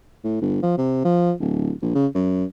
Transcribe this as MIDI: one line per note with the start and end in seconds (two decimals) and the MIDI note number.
0.25 0.40 45
0.42 0.62 31
0.63 0.75 53
0.78 1.03 48
1.05 1.33 53
1.40 1.72 26
1.82 1.92 34
1.95 2.07 49
2.15 2.45 42